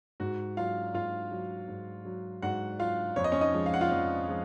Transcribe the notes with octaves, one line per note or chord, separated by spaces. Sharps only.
G#2 F#4
F#3 F4 F5
G#2 F4 F5
F#3
G#2
F#3
G#2 F#4 F#5
F#3 F4 F5
F2 C#5
D#5
C#4 C#5
D#4 D#5
F3 G#3
F5
F#5
F4 F5
F2
F3 G#3